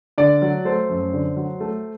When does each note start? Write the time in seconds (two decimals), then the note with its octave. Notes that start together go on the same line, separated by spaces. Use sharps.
0.18 D3 D5
0.42 F#3
0.65 A3 C5
0.89 F#2
1.13 D3
1.37 F#3
1.61 A3